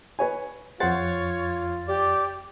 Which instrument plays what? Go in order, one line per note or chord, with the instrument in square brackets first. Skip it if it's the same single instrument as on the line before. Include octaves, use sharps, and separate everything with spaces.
[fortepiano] B4 C#5 G#5
[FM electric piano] F2 A6 [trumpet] F4 [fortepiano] C5 F#5 [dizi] C#5
[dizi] G4 [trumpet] D5